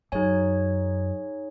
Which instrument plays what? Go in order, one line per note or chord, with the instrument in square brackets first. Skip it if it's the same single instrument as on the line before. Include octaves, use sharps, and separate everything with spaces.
[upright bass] F#2 [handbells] D#4 G#4 C#5 G#5